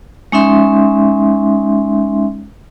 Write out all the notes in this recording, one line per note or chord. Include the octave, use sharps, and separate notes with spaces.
G#3 C#4 D#4 E5 C6